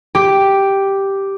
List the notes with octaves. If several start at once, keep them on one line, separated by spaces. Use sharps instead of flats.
G4